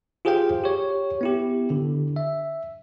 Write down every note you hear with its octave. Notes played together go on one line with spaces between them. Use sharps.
F4 G4 G#4 C5 F5 G5
G4 C#5
B3 E4 G4
D3
E5